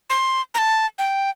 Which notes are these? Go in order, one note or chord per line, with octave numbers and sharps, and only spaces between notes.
C6
A#5
A5
G5